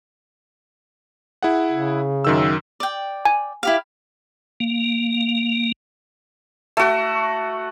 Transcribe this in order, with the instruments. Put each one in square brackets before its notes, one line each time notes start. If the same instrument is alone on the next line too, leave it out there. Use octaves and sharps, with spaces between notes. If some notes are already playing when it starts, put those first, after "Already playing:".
[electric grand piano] E4 G#4 F#5
[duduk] C#3
[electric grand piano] F#2 D#3 E6
[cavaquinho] D5 G5
[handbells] G#5
[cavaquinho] E4 G4 F5
[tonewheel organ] A#3
[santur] A3 F#4